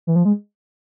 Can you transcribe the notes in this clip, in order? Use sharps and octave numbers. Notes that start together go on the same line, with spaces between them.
E3
F3
G#3